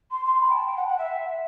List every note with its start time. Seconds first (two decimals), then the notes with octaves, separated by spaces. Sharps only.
0.10 C6
0.25 C6
0.40 B5
0.49 G5
0.55 A5
0.66 G5
0.76 F#5
0.87 F#5
0.98 E5